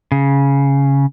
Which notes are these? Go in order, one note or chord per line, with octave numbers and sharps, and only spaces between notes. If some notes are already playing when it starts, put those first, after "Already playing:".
C#3